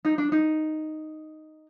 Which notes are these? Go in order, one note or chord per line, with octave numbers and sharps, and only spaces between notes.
D#4
D4
D#4